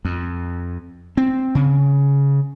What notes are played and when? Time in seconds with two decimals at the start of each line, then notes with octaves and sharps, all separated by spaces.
0.05 F2
1.17 C4
1.55 C#3